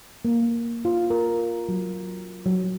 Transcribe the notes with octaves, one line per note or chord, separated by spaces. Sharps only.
A#3
F4
A#4
F#3
F#3